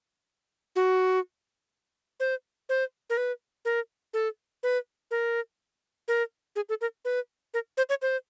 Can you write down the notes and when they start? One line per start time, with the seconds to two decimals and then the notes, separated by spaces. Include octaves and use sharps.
0.76 F#4
2.20 C5
2.69 C5
3.10 A#4
3.17 B4
3.65 A#4
4.14 A4
4.63 B4
5.11 A#4
6.08 A#4
6.56 G#4
6.69 A4
6.81 A#4
7.05 B4
7.54 A#4
7.77 C5
7.89 C#5
8.02 C5